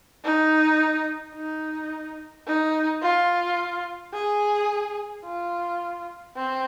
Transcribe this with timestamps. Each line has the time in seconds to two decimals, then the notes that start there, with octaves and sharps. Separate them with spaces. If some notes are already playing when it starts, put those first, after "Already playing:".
0.24 D#4
1.35 D#4
2.47 D#4
3.02 F4
4.14 G#4
5.26 F4
6.37 C4